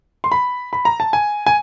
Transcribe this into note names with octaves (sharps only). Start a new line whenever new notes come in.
C6
B5
B5
A#5
A5
G#5
G#5